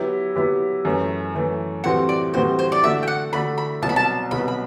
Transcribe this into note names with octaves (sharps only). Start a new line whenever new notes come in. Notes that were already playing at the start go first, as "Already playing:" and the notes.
Already playing: F#3 B3 E4 G4
F#3 B3 E4 G4
F#2 E3 A3
F#2 E3 A3
A2 E3 G3 C4 F#4 F#5
D5
A2 E3 G3 C4 F#4 C5
C5
D5
D3 A3 D4 F#4 E5
G5
F#5
D3 A3 D4 F#4 B5
B5
C2 B2 F#3 A5
B5
A5
C2 B2 F#3 B5
B5